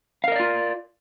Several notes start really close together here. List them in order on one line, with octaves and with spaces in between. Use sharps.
F5 A#4 D#5 D5 F4